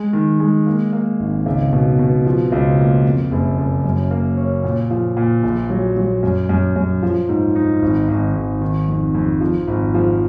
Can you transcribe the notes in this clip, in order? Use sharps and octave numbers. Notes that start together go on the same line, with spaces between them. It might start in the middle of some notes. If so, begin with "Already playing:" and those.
Already playing: G#3
D#3
G#3
A#3
A#3
G#1
C#2
B2
B2
F3
C#2
A#3
F2
F#1
F#1
F#2
A#3
C#4
A#2
F3
A#2
A#1
F#3
F#3
F#2
F#2
F#2
F3
G#2
D#4
G#1
G#1
G#1
D#3
F2
F2
F3
G#1
F3